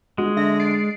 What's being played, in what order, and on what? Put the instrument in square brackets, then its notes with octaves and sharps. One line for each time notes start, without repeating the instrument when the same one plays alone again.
[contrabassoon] G1 [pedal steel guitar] G#3 [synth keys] F#4
[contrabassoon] D3 [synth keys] E5 A#6
[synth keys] A6 C7 D7